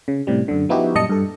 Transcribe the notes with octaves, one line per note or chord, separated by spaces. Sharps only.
C#3
A2 C3 G3
F#2 D3
F3 B3 D#4 E4 F#4 G4
F#2 A#2 G3 D#5 A5 C#7
G2 A4